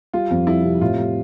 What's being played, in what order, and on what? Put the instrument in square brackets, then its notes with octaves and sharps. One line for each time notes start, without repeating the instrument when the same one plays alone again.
[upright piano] G3 [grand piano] F4
[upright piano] F2
[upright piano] G3 [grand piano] E4
[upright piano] C3
[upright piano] A2 [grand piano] F4
[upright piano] G3